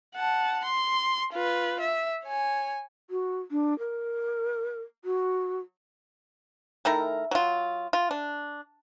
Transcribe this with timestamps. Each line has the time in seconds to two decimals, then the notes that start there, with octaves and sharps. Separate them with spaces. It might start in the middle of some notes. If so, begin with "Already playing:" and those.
0.15 F#5 A5
0.64 C6
1.33 F4 B4
1.80 E5
2.24 C#5 G#5
3.10 F#4
3.51 D4
3.79 A#4
5.05 F#4
6.85 D#3 A3 E4 A#4
7.31 F#3 F4
7.93 F4
8.11 D4